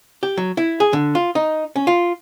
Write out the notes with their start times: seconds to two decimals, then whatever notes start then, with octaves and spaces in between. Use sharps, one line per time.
0.23 G4
0.37 F#3
0.57 E4
0.80 G#4
0.93 D3
1.15 F4
1.35 D#4
1.76 C#4
1.87 F4